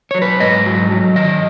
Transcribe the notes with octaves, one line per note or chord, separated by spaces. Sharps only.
F#3 C#5
B4
G#2 D#5
F#3
F#3
D#3 D#5